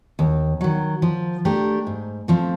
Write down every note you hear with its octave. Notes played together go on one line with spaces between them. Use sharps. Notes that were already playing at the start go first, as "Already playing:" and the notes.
D#2
D#3 F#3
F3
A3 D4 G4 A#4
G#2
F3 A3 C4